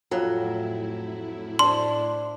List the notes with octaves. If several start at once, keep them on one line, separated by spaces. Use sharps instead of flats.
F2 A2 F#3 E4
D4 C5 C6